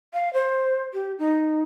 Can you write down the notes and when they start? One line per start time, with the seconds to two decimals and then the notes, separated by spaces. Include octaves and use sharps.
0.14 F5
0.33 C5
0.93 G4
1.19 D#4